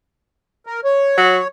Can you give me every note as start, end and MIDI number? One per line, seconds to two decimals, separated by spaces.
0.66 0.81 70
0.84 1.48 73
1.17 1.38 54